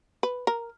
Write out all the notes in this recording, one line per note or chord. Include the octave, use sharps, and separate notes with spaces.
B4
A#4